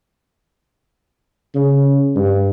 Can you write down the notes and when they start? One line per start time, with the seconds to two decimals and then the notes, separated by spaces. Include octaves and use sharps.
1.55 C#3
2.16 G2